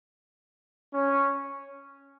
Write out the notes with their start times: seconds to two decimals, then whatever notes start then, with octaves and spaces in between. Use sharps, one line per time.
0.94 C#4